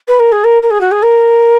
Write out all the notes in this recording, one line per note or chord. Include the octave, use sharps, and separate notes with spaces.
B4
A#4
G#4
A#4
A#4
G#4
F#4
G#4
A#4